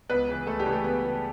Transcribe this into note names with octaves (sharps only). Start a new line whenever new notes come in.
C#2 B3 B4
C#3 E3
C#2 A3 A4
G3 G4
C#3 E3
A3
C#2 B3
C#3 E3